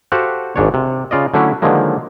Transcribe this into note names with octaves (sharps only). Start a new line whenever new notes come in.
F#4 G4 A4 C5 F5 F#5
G#1 G#2 D4 C#5
C3
C#3 F4 D5 D#5
D3 F#3 A3 C#4 D4 E4
D3 D#3 F3 F#3 G#3 A#3